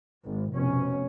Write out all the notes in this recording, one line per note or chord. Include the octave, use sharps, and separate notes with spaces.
G#1
F1 B2 C#4